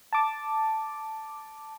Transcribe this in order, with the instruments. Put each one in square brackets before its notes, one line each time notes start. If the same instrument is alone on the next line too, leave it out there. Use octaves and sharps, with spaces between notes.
[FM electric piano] A5 D6